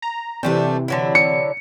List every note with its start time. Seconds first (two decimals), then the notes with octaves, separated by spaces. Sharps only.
0.02 A#5
0.43 C3 E3 G3 A3 C4 D4
0.88 D3 F#3 E4
1.15 C#7